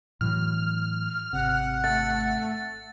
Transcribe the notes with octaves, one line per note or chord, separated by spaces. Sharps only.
A2 E3 F#3 F6
G#1 C3 F#5
A3 A6